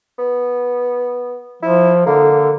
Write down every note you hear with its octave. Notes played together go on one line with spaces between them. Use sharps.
B3
F3 E4
D3 A#3